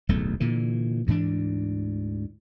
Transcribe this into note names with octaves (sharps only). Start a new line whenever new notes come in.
D1 B1 E2 A3
A#2 D3 E3
D2 G#2 E3 D4